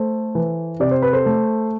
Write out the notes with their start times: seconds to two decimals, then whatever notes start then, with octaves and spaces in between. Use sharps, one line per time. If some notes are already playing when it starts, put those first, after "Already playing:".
Already playing: A3 A4 C5
0.35 E3
0.80 C3 D5
0.91 C5
1.02 B4
1.13 A4 C5
1.26 A3